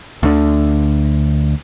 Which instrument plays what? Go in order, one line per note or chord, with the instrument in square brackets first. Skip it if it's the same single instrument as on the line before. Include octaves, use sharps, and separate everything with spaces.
[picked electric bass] D2 D3